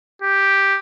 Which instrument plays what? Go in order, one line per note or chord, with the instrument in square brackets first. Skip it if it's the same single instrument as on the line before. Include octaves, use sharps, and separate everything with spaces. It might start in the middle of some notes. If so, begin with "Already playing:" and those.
[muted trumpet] G4